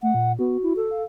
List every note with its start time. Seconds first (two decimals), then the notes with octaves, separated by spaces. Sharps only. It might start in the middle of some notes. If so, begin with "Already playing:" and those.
0.02 A3 F#5
0.14 A#2
0.39 B3 F#4
0.63 E4
0.76 A4
0.91 F5